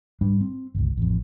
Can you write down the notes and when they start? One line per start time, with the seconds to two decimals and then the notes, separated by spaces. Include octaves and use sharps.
0.21 G#2 G3 D4
0.41 C4
0.75 G1 C#2
0.97 A1 F2